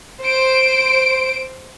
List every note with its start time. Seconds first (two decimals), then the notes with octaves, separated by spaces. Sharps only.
0.22 C5 D7